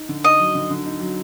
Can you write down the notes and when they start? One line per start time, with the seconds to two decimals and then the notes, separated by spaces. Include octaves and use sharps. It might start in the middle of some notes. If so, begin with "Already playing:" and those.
Already playing: D#4
0.09 D3
0.24 D#4 D#5
0.40 F#3
0.55 D3
0.70 D3
0.86 D#4
1.01 F#3